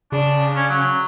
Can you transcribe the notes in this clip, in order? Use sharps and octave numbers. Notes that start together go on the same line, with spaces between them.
C#3 D4
C#4
F#3